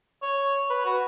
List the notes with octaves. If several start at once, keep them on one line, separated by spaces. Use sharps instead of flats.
C#5
B4
F#4